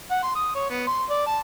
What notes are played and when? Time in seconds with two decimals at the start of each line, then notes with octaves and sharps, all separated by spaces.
0.11 F#5
0.23 C6
0.36 D#6
0.55 C#5
0.70 B3
0.87 C6
1.10 D5
1.27 A5